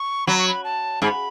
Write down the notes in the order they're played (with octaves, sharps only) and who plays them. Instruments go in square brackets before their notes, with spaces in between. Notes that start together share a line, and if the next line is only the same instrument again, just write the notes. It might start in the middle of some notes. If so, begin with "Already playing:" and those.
Already playing: [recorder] C#6
[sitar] F#3 [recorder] B5
[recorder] C#6
B5
A5
[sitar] G#2 [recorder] B5